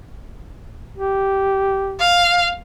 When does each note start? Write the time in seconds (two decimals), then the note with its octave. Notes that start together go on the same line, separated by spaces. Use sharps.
0.97 G4
2.00 F5